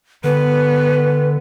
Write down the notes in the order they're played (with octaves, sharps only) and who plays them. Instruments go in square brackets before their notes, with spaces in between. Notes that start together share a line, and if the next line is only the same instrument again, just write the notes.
[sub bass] D3 [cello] B3 [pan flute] B4